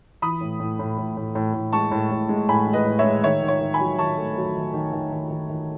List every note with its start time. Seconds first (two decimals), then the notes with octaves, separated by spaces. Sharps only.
0.22 E3 B5 D#6
0.41 A2
0.60 A2
0.79 A2
0.98 A2
1.17 A2
1.35 A2
1.54 A2
1.72 G#3 A5 C#6
1.91 A2
2.11 A2
2.29 G#3
2.49 A2 G#5 B5
2.67 G#3
2.73 B4 D#5
2.86 A2
2.99 C#5 E5
3.04 G#3
3.23 D#3 C#5 E5
3.43 D#3
3.48 C#5
3.61 D#3
3.74 G#5 B5
3.80 F#3
3.98 D#3 A5 C#6
4.17 A3
4.36 F#3
4.55 D#3
4.74 D#3
4.93 D#3
5.12 D#3
5.30 D#3
5.50 D#3